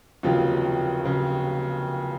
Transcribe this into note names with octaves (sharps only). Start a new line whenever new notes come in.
F1 D#2 C#3 F#3 F4
C#3 F#3